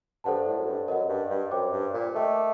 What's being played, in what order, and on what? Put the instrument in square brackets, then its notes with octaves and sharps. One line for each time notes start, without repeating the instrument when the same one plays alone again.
[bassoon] G2 [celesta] A4 C5 F#5 A5
[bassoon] A2
F#2
G2
[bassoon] F#2 [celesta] A#4 D#5 F#5
[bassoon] G2
G2
[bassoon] F#2 [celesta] C5 G5 D6
[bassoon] G2
A#2
[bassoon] A3 [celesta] A#4 D#5 G5 D6